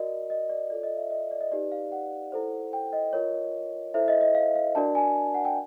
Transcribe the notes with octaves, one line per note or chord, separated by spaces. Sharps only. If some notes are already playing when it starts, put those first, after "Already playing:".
Already playing: F#4 A#4 D5 D#5
D#5
D5
F4 A4 C#5 D5
D#5
E5
D#5
D#5
D5
D#5
D#4 G4 B4 D5
F5
F#5
E4 A4 C5
G5
D#5
F4 A#4 C#5
E4 A4 C5 E5
D#5
D#5
F5
F5
D4 F#4 A#4 D5 A5
G#5
F#5
G5